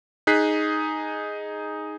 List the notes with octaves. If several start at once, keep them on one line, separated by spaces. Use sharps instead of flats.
D#4 G#4 F#6 B6 C7